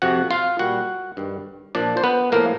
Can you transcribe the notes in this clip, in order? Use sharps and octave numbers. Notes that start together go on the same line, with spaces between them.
F2 C3 F3 F#4 F#5
F4 F5
A#2 G3 F#4 F#5
G2 D#3 G3
A#2 F3 D4 D5
C5
B3 B4
A2 F3 A#3 A#4